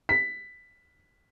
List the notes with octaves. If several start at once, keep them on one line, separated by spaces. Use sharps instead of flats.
B6